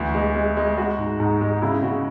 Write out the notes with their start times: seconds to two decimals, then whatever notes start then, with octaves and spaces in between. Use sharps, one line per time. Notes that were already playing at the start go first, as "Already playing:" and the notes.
Already playing: D2 E3
0.14 G#3
0.35 G#3
0.57 G#3
0.78 G#3 F#4
0.98 G#2
1.20 G#2
1.41 G#3
1.62 C#3 E4
1.83 C#3 F#4